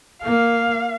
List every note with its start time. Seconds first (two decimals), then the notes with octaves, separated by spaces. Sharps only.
0.23 A#3 F5